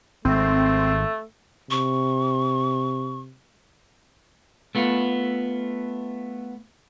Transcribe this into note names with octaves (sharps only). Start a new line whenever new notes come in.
G#1 A3 C4
C3 C#6
A3 B3 F4